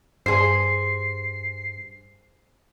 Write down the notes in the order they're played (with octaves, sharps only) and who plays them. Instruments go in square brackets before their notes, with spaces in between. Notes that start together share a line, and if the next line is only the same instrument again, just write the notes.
[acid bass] G2 [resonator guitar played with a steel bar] G#4 C5 [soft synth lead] C7